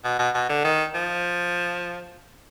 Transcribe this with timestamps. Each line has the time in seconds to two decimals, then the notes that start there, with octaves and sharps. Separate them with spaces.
0.05 B2
0.19 B2
0.34 B2
0.49 D3
0.64 D#3
0.95 F3